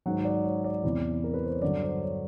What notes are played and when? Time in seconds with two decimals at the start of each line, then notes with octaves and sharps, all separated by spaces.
0.06 G#2 D#3 F#3 F#5
0.25 D5
0.44 C#5
0.64 D5
0.83 E2 C3 E3
1.24 A#4
1.34 B4
1.43 C5
1.52 C#5
1.62 G2 D3 F#3 D5
1.82 C5
2.02 C#5